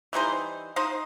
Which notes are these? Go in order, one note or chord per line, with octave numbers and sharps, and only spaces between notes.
E3 G3 D#4 C5
D#4 C5 D#5